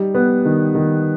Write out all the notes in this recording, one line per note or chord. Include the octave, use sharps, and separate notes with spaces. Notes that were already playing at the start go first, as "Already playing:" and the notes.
Already playing: G3 D#4
B3
D#3
D#3